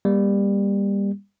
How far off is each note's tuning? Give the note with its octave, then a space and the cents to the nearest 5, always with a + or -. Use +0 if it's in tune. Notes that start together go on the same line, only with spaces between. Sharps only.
G3 +20 A#3 +35